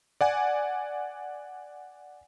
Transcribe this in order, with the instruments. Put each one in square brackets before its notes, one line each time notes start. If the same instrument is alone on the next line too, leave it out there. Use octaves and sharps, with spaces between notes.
[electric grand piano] D5 F#5 G#5